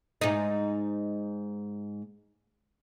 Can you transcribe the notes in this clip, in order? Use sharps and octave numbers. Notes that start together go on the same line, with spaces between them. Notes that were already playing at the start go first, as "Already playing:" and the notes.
G#2 D#4